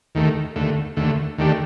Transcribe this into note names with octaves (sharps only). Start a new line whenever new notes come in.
D#2 D#3 A3
D#2 D3 A3
D#2 D3 A3
D#2 D#3 A3 D4 G4